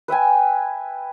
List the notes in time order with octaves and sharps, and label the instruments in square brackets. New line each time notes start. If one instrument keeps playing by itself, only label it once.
[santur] B4 E5 G5 G#5